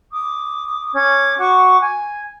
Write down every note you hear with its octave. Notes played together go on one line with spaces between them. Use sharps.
D6 D#6
C#4 D6 G#6
F#4 C#6 D6
G#5